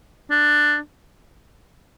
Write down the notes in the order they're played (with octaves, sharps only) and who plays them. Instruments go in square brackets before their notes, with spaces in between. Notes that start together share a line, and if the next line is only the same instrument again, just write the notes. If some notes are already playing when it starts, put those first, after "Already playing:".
[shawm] D4